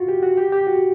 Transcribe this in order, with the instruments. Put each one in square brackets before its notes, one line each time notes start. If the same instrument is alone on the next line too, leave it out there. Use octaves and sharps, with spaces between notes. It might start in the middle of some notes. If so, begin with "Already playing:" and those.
Already playing: [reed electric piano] F4 F#4
G4
F#4
G4
G4
F#4